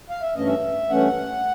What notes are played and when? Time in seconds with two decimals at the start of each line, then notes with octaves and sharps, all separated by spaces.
0.10 F5
0.22 E5
0.35 G2 E3 A3 C#4 D#5
0.47 E5
0.89 G2 E3 A3 C#4 F#5